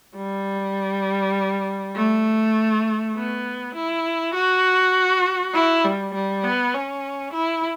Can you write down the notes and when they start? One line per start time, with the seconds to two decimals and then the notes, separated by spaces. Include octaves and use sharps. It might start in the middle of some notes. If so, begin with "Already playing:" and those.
0.16 G3
1.95 A3
3.16 B3
3.75 E4
4.34 F#4
5.54 E4
5.85 G3
6.14 G3
6.44 B3
6.74 C#4
7.33 E4